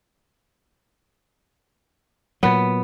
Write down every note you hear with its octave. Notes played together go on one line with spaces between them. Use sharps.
A#2 F#3 B3 B4